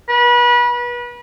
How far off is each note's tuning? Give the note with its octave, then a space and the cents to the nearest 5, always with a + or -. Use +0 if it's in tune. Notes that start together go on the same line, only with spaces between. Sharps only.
B4 -30